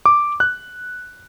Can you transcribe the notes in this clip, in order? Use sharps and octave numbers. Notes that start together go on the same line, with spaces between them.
D6
F#6